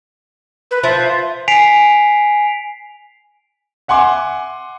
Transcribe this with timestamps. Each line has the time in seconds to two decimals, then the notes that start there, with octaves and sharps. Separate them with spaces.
0.71 B4
0.84 F3 E5
1.48 G#5 B6 C7 D7 F7
3.88 E5 F#5 G#5 C6 D6